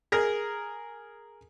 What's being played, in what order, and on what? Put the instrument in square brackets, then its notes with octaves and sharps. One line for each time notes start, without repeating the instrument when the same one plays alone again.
[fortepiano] G#4 A#4 A#5